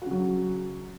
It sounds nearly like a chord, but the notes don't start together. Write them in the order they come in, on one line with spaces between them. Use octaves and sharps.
F#4 C#3 F#3